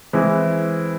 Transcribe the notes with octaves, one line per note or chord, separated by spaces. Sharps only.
E3 G#3 C4 E4